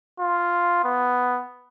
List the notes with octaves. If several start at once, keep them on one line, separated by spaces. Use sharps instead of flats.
F4
B3